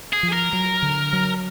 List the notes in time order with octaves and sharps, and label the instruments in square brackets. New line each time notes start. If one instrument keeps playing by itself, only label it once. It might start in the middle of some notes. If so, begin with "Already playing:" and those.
[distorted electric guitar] G#4
[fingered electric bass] F3
[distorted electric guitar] A#4
[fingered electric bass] F#3
D3
F#3